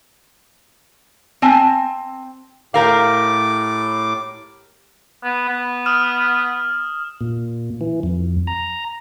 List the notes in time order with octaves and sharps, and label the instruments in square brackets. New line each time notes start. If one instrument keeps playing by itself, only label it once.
[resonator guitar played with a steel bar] C4 G#5 A5
[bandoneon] A2 D6 [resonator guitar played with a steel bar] G4 A#4 F5
[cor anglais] B3
B3
[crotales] D#6 F6 E7
[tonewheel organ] A#2
E3
F2
A#5